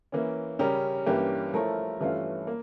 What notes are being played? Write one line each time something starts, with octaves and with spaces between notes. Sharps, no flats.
E3 A#3 C#4
C#3 G3 C#4 G4 A#4
G2 E3 A#3 C#4 G4
F3 A3 E4 A#4 C#5
G2 E3 A3 C#4 F4
A#3